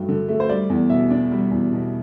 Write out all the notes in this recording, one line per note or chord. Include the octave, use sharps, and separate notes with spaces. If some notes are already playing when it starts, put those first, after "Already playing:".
Already playing: G2 F#3 A3 G5
D3
A3
C5
G3 D5
E2
B2 E5
D4
G3
E2
B2